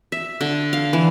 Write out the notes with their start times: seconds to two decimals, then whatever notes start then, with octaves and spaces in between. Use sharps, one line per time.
0.12 E5
0.41 D3
0.73 F5
0.93 E3